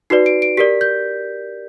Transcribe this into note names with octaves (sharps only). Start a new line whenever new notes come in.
D#4 F#4 B4 D5 C7
D7
D7
G4 A#4 D5 B6
G6